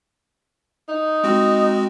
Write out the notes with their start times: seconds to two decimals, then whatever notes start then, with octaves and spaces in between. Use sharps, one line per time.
0.88 D#4
1.24 G#3 C4 F#4